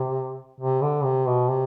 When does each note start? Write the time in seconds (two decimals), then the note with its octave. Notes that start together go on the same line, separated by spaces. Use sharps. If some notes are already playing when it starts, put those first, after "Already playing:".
Already playing: C3
0.60 C3
0.82 D3
1.04 C3
1.26 B2
1.48 C3